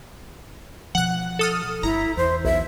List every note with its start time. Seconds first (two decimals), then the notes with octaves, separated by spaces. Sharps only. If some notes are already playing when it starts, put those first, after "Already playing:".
0.95 B2 F3 F#5 F#6
1.39 A4 D#6 F6
1.83 G1 E4 A#5
2.17 E2 C5
2.45 B1 E5